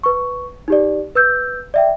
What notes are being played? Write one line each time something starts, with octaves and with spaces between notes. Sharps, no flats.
B4 C#6
D#4 G4 D5
B4 E6 G6
D5 E5 G5